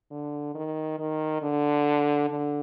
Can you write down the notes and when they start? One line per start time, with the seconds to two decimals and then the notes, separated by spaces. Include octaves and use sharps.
0.11 D3
0.54 D#3
0.99 D#3
1.42 D3
2.30 D3